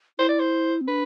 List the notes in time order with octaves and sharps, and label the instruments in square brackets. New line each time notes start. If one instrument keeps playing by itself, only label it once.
[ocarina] E4 [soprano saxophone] C5
[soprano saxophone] D5
C5
[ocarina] C4
[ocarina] D4 [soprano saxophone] B4